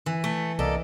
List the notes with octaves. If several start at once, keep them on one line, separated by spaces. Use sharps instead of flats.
E3
A3
C2 A#3 A4 D5 D#5